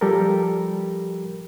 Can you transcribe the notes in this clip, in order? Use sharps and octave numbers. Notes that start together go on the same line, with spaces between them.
F3 G3 G4 A4 A#4